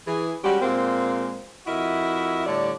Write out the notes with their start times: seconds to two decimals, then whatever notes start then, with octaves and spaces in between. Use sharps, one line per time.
0.07 E3 G#4
0.44 G3 G#3 C#4 F#4 G4
0.61 A#2 G#3 A#3 C4
1.67 F2 E4 F#4 A#4 D#5 E5
2.46 A2 D3 G3 C#5 D5